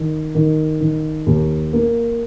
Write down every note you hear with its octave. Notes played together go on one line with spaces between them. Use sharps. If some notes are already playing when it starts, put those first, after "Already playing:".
Already playing: D#3
D#3
D#3
D#2
A#3